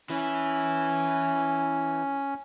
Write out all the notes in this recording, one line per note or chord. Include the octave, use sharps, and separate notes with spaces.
E3 C#4 E4